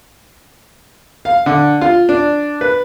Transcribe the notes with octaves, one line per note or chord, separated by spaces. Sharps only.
F5
D3
F4
D4
B4